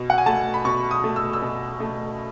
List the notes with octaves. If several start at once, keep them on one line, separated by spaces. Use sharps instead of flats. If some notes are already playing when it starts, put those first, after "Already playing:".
Already playing: B2
F#5
G#5
A3 A5
B5
B2 C#6
D#6
A3
E6
E6
B2
A3